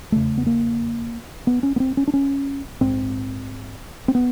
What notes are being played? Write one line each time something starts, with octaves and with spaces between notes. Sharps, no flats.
F1 E2 C#3 A3
B3
A#3
B3
C#4
B3
C4
C#4
D4
C#4
A#1 G#2 C4
C4
B3